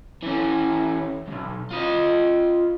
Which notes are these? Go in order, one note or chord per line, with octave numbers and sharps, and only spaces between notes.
E3 C#4
B1 G2
F4 D#5